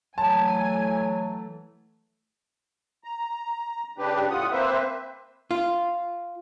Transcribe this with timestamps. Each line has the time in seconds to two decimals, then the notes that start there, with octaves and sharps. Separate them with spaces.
0.18 E3 F#3 A3 G#5 A5
3.04 A#5
3.98 C#3 D4 G4 B4
4.30 A2 F4 F#5 D#6
4.51 A#3 C4 B4 C5 E5
5.51 F4